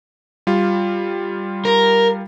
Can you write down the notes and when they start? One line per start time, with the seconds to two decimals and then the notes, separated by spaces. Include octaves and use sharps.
0.47 G3 F4
1.65 A#4